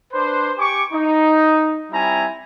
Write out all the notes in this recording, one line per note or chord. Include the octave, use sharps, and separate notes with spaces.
D4 B4 C5
G4 G#5 C#6 D6
D#4
G3 C4 E4 G#5 A#5